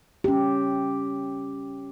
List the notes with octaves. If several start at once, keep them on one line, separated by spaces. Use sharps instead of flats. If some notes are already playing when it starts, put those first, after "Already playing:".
C#4 G4